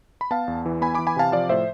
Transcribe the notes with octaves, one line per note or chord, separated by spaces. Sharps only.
B5
B3 F5 A5
E2
E3
B3 G#5 B5
E3 B5 D6
G#5 B5
C3 F5 A5
F3 D5 F5
A2 C5 E5